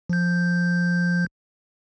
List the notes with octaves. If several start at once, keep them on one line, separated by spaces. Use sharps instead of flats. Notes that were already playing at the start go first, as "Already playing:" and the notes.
F3 G6